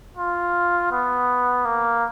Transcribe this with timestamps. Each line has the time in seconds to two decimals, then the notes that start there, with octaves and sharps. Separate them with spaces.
0.17 F4
0.92 B3
1.65 A#3